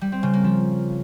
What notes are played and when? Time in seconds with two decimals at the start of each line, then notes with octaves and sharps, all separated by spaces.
0.01 G3
0.12 C4
0.23 C#3
0.33 A#3
0.44 F3